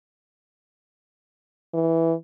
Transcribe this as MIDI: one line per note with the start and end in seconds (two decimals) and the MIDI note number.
1.74 2.13 52